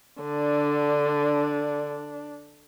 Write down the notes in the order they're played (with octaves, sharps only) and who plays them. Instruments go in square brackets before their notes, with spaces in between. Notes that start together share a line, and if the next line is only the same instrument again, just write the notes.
[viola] D3 [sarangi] D4